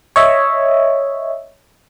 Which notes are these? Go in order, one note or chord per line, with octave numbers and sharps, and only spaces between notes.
C#5 D#5 E5